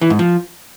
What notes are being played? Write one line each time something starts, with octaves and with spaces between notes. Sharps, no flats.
E3
G#2
F3